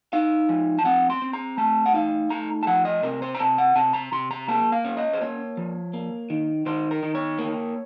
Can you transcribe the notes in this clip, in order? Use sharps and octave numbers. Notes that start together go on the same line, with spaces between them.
D#4 F5
F3
A5
C4 F#5
C6
C4
A#5
A3 A5
F#5
D#4 F5
A3 A#5
A5
F3 F#5
D#5
C3 A#4
C5
A#5
C3 A5
F#5
C3 A5
A#5
C3 C6
A#5
A#3 A5
F5
C#4
D#5
C5
A#3 C#5
F3
A#3
D#3
D#3 C5
A#4
D#3
C#5
A#3